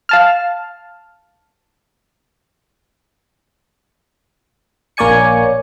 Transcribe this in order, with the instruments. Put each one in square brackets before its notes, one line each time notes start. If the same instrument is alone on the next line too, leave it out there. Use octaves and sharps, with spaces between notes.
[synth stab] F5 A5 F6
[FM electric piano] A#1 A#3 C#5 D5 G#5 C#7